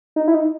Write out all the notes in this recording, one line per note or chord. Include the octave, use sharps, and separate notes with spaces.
D#4
E4
D#4